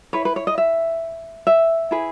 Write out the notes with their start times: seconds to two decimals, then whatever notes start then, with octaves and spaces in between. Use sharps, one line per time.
0.13 E4 B4 C#5
0.25 B4
0.36 C#5
0.47 D#5
0.58 E5
1.47 E5
1.91 E4 G#4 B4